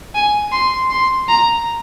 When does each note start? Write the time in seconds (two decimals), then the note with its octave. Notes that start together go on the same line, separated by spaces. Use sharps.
0.15 G#5
0.52 C6
0.90 C6
1.29 A#5